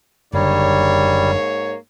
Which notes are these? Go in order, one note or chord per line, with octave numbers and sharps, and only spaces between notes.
F#1 G#2 D3 G3 A#3 C#5